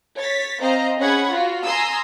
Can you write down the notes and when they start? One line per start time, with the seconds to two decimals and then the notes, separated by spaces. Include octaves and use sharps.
0.17 C#5 A6 B6
0.60 C4 C5 D#5 F5 A#5
0.99 C#4 G#4 C#5 F#5 B5 G#6
1.30 F4 F#4
1.64 G#5 A#5 C6 D#6 E6